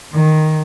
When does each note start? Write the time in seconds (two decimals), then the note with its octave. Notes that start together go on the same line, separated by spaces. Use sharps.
0.14 D#3